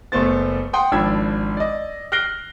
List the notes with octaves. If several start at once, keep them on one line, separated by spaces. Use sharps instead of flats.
F#1 A3 B3 C5 A6
F#5 G5 C6 D#6
G#1 F3 D4 B5 E6 G#6
D5 D#5
F6 F#6 A#6 C7 D7 G7